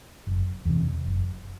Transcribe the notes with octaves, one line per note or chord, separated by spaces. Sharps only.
F#1
E2 C3
F#1